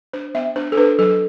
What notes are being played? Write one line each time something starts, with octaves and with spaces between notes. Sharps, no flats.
D4 C5
B3 E5
D4 C5
A4
D4 B4
F#3 A4